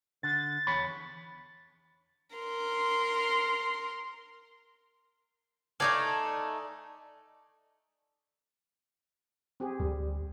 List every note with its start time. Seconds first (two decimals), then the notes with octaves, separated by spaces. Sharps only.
0.23 D3 A6
0.67 E2 C#5 B5
2.36 A#4 C6
5.80 A3 D#4 A4 D5 F5 G#5
9.60 C4 G4 G#4
9.80 D2 G3